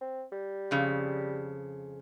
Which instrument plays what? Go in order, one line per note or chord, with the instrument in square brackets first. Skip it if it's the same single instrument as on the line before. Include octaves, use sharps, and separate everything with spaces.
[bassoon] C4
G3
[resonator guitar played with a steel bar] F2 C#3